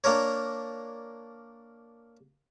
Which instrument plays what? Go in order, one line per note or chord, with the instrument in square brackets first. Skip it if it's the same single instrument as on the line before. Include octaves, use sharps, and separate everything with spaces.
[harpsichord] A#3 D4 A#4 C#5